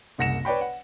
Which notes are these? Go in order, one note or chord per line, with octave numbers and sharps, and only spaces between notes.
F#1 C2 F#5 A#6 C#7 E7
B4 C#5 D5 G5 B5
F#5